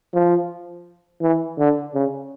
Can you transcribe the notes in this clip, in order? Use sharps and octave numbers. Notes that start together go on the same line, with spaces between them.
F3
E3
D3
C#3